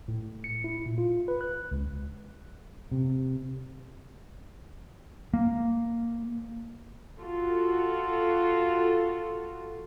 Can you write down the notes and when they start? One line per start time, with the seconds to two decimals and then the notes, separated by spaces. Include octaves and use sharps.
0.08 A2
0.44 C#7
0.64 E4
0.86 A#2
0.98 F4
1.28 B4
1.41 F#6
1.71 C#2
2.92 C3
5.34 A#3
7.19 F4 F#4 A4